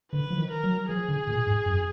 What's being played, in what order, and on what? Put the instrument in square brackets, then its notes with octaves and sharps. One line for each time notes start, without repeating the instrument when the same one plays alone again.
[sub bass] D3 [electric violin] B4
[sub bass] F3
D#3
[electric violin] A#4
[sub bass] F#3
[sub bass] F3 [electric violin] G#4
[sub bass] D3
A#2
G#2
F#2